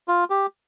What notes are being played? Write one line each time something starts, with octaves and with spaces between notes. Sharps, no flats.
F4
G4